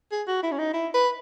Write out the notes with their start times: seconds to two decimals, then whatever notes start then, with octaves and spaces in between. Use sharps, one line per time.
0.12 G#4
0.27 F#4
0.43 E4
0.52 C#4
0.58 D#4
0.73 E4
0.94 B4